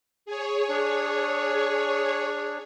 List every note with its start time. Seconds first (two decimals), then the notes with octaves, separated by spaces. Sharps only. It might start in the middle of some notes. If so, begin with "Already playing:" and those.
0.26 G#4 C#5
0.69 D4